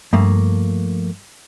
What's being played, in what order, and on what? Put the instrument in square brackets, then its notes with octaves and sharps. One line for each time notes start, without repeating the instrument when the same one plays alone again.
[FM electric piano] G2 [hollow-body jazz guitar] F3 A3 A#3